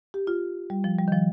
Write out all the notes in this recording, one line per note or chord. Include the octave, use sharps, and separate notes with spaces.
G4
F4
G3
F3
G3
D#3
F3